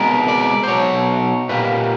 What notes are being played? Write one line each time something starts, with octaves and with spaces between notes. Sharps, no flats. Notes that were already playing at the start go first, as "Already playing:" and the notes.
Already playing: C2 B2 G#3 B3 A#4
D5
C5
B1 B2 F#3 C#5
A#2 G3 A#3 B4